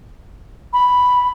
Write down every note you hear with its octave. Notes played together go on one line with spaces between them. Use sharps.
B5